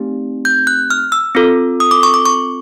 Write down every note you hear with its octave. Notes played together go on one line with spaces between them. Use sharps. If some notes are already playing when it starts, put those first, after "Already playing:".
Already playing: A3 C4 D#4 G4
G6
F#6
F6
E6
C4 F4 A4
D#6
D6
C#6
D6
C#6